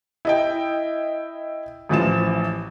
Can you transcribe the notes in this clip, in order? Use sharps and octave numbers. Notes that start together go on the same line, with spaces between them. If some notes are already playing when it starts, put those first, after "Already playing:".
E4 D#5 G5
A1 E3 F3 E7